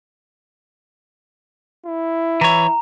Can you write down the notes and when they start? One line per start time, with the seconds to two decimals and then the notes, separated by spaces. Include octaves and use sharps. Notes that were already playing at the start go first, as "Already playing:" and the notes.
1.86 E4
2.41 E3 C#5 A#5